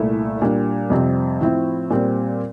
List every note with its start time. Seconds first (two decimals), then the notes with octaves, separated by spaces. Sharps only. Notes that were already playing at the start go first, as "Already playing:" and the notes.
Already playing: C2 A#2 A3 E4
0.42 A#2 G3 D4
0.90 F2 C3 G3 C4
1.40 A2 F3 C4 E4
1.90 A#2 G3 C4